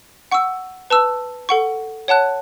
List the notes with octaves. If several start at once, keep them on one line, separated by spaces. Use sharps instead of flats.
F#5 C#6 E6
B4 A5 E6
A4 F#5 C#6
C#5 F#5 A5 F#6